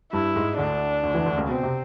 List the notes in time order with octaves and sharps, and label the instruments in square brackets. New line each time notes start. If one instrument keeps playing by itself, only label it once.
[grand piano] G2 G3 [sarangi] E4
[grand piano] G#2 G#3
[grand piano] D2 D3 [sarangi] D4
[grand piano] D2 D3
E2 E3
D2 D3
C#2 C#3
[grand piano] B2 [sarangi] C4
[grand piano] C3